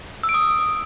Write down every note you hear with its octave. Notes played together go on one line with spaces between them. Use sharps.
E6
D7
D#6